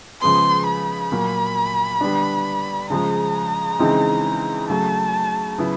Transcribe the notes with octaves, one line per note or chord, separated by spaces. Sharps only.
C#3 F3 G#3 B3 C6
B5
A#2 F#3 A#3
D3 G3 B3 D4
C#3 F3 G#3 A#5
C#3 E3 G#3 C4 D#4
C#3 F#3 A3 A5
C#3 F#3 B3 E4